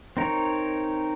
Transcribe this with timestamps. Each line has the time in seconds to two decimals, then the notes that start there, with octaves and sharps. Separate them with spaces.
0.17 C4 D#4 A#4 C#5